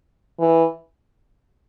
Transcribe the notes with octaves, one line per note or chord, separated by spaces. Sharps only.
E3